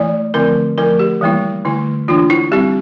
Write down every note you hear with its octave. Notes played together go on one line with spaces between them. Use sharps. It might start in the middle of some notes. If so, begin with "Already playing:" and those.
Already playing: E3 A3 E4 D5
D3 F3 A3 C4 E4 A#4
F3 A3 E4 A#4
G4
E3 G3 A#3 E4
D3 A3 E4
E3 A#3 D4 F4
E4
G3 C4 E4 G4